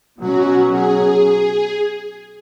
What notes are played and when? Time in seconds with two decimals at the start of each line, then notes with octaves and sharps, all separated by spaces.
0.20 B2 F#3 C#4 F#4
0.70 G#4